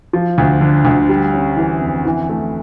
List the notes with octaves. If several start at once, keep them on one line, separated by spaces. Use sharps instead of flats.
F3
D2
D3
D2
G3
C#4
E3
F2
E3
A3